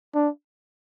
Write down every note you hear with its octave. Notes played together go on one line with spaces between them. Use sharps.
D4